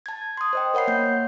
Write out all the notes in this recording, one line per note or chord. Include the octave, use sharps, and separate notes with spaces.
A5 G#6
C6 D#6
C5 D#5 G5
A#4 C#5 F#5 B5 C7
A#3 G6